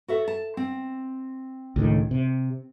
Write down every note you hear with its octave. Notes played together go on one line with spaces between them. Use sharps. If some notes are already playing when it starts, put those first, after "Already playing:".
F#4 A4 E5
A5
C4
C#2 A2 D#3
C3